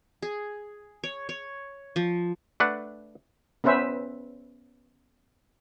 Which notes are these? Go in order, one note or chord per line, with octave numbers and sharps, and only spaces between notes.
G#4
C#5
C#5
F3
A3 D4 B4 F#5
B3 C#4 B4 C5 E5